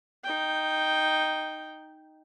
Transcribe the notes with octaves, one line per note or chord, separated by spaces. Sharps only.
D#4 G5